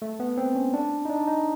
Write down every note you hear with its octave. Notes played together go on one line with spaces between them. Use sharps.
A3
B3
C4
C#4
D4
D#4
D4
D#4